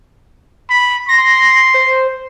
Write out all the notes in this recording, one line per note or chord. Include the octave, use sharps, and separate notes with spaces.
B5
C6 A#6
C5